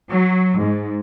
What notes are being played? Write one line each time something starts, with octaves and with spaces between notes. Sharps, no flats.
F#3
G#2